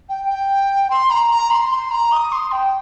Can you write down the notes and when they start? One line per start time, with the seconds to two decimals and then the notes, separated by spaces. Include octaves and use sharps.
0.09 G5
0.29 G5
0.90 C6
1.10 A#5
1.30 A#5
1.50 C6
1.71 C6
1.90 A#5
2.11 D#6
2.32 C6
2.51 G5